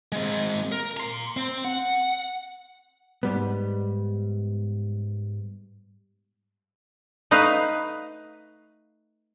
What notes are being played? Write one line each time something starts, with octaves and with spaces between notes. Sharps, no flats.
G#3 C4
A#4
A#5 C6
C4
F#5
G#2 G3 B3
A3 D#4 B4 F5